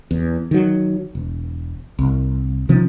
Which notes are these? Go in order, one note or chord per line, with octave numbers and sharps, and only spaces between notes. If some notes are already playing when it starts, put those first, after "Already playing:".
E2
D#3 F#3
E1
C2
C3 D#3 F3 C#4